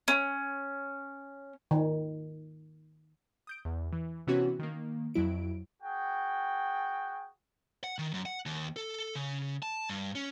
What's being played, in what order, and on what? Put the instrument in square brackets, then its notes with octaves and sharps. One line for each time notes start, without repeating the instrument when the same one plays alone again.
[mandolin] C#4
[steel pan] D#3
[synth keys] D#6 G6 D7
E2
E3
C3 E3 B3 C#4 F#4 C#5
D#3 A#3
F2 F#3 E4 D7
[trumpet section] F#4 G#4 G5
[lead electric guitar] F#5
D#3
F#2
F#5
D#2
A4
C#3
A5
G2
C#4